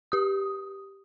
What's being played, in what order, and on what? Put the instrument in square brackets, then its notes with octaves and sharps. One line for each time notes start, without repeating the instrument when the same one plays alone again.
[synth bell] G4 D#6